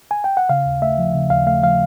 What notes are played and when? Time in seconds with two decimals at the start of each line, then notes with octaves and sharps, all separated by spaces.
0.11 G#5
0.24 G5
0.37 F#5
0.49 C#3 F5
0.66 D#2
0.82 A3 E5
0.98 F3
1.14 C#3
1.30 D#2 F5
1.46 A3 F5
1.63 F3 F5